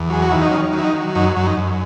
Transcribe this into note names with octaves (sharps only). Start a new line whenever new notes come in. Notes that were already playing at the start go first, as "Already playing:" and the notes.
Already playing: E2
F#3 G#4
F#4
D#3 E4
D#4
D#3 C#4
F#3
E4
D#4
F#3
F#2 D#4
F#2
D#4
F#2